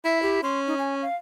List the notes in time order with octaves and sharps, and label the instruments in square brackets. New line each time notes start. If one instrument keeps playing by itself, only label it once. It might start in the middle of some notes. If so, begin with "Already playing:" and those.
[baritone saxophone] E4 [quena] E5
[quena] G4
[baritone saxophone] C#4 [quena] C6
[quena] D#4
G#5
F5